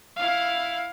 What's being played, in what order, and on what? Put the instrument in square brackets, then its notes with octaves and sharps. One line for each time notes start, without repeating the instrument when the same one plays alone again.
[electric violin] E4 F5